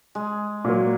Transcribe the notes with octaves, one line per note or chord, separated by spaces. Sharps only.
G#3
A#2 F#3 A#3